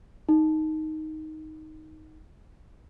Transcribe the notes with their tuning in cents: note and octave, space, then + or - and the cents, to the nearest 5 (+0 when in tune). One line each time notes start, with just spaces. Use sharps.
D#4 +5